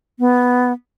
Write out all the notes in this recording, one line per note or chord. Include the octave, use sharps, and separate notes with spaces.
B3